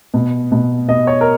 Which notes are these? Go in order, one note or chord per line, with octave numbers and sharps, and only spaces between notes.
B2
B2
B2 D#5
C#5
A#4